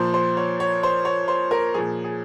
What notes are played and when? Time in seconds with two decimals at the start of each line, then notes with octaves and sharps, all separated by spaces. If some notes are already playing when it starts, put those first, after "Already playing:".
Already playing: A#2 F3 C5
0.14 C5
0.37 C#5
0.60 C#5
0.83 C5
1.05 C#5
1.28 C5
1.51 A#4
1.74 A#2 F3 G#4
2.04 G#4